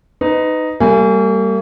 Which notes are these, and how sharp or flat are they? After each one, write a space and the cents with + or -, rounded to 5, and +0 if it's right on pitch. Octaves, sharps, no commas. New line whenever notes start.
D#4 +0 B4 +30
G3 -5 A#3 -45 G#5 +0